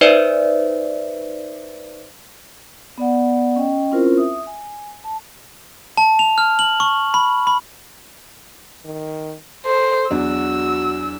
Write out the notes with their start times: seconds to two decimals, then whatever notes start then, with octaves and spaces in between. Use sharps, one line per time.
0.01 D#4 B4 C5 D5 E5
2.98 B3 D5 F#5
3.56 C#4 D#5 G5
3.91 C4 C#4 E4 F4 A#4 C5
4.17 E5 D#6
4.47 G#5
5.04 A5
5.97 A5
6.19 F7
6.38 F6
6.59 F#7
6.80 C#6
7.14 B5
7.47 B5
8.85 D#3
9.66 A4 C5
10.11 E2 F#3 D4 F#4 E6